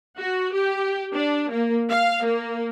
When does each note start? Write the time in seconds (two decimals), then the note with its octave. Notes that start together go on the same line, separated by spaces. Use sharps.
0.19 F#4
0.55 G4
1.14 D4
1.51 A#3
1.90 F5
2.24 A#3